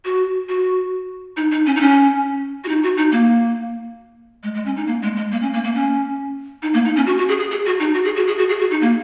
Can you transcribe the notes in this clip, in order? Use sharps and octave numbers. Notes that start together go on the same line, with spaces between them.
F#4
F#4
D#4
D#4
C#4
D#4
C#4
F#4
D#4
F#4
D#4
A#3
G#3
G#3
C#4
D#4
A#3
G#3
G#3
A#3
C#4
A#3
A#3
C#4
D#4
A#3
D#4
C#4
F#4
F#4
G#4
G#4
G#4
F#4
D#4
F#4
G#4
F#4
G#4
F#4
G#4
F#4
D#4
A#3